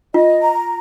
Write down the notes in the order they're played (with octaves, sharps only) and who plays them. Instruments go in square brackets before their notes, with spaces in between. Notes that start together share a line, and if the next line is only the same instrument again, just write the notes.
[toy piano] F4 [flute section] D#5
[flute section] A#5